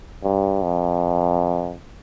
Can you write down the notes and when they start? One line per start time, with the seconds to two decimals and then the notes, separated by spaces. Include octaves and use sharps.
0.23 G2
0.62 F2